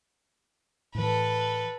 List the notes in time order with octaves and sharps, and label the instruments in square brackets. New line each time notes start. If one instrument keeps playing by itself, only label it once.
[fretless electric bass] A2 E3 [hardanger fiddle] A4 B4